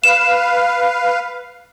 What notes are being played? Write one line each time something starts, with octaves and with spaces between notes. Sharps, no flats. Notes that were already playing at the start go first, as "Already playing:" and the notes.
B4 F5 E7